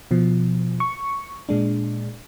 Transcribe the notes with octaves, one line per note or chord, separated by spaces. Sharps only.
B2 F3
C#6
A#2 G#3 D4